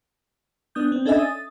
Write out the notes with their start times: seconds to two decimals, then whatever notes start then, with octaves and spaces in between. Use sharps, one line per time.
0.75 B3 D4 D#6 G6
0.92 C4
1.05 C#4 D4 A4 D#5 E5 G#5
1.19 D#6 A6